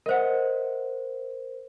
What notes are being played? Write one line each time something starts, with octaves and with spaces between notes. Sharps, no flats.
A#4 C5 D#5 E5 F#5